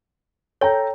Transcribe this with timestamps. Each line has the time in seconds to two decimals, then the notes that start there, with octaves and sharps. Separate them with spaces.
0.61 A4 C#5 G5 A#5